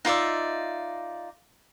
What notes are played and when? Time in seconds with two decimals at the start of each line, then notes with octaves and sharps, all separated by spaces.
0.05 D#4 F4 D5 E5